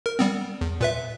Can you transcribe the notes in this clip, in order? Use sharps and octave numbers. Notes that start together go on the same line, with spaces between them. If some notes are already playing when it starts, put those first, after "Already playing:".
A#4
G3 B3 C4
E2
A#2 B4 E5